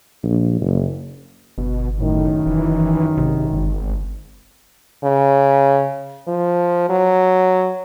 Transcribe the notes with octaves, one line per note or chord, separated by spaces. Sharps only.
A#1
F#1
G1 B2
F#2 A2 D#3
F1 E3
G#1 C3
G1
C#3
F3
F#3